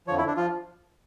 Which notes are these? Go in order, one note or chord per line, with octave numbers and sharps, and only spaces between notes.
F2 D3 F3 C#5
E4
D4
F3 F4